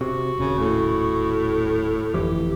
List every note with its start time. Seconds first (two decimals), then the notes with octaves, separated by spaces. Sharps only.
0.01 C3 F#4
0.38 D#1 C#3
0.59 A2
2.14 G1 F2 E3 G4